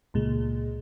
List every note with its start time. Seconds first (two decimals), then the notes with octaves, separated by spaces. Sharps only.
0.14 C#2 A#2 G#3